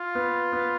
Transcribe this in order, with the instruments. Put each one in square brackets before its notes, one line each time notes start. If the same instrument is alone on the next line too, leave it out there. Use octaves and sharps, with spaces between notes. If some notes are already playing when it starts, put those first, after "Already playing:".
Already playing: [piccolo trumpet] F4
[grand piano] B3
B3